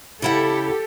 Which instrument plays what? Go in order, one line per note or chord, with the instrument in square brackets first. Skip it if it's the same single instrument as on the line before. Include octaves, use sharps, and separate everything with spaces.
[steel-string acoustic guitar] C#3 E4 F#5 [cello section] G4 A4